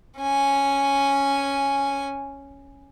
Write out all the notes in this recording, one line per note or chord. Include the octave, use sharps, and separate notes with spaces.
C#4 G#5